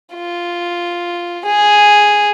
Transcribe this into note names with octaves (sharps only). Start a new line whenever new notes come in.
F4
G#4